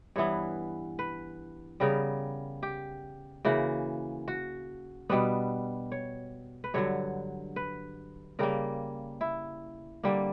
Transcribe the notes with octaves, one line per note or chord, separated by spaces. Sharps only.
G2 E3 B3 C#5
B4
C#3 G3 B3 A#4
G4
C#3 E3 A#3 F#4
F#4
B2 G3 B3 D4
C#5
B4
G2 D3 F#3 C#5
B4
C#3 G3 A#3 A#4
E4
D3 G3 A#3